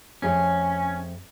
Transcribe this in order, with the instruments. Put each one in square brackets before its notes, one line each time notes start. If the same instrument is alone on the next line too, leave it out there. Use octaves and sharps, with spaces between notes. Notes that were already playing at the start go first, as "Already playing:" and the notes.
[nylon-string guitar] F2 A3 G#4 [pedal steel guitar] C#4